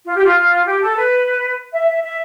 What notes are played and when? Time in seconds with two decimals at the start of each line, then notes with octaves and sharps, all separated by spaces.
0.05 F4
0.16 G4
0.24 F4
0.66 G4
0.81 A4
0.97 B4
1.73 E5
1.87 E5
2.03 E5